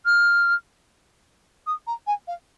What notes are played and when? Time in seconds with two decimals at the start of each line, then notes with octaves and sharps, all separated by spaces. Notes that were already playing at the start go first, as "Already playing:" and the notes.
0.05 F6
1.66 D#6
1.87 A#5
2.07 G#5
2.27 F5